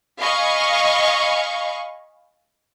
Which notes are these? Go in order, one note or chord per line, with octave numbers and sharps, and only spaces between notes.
D#5 F5 G#5 B5 C#6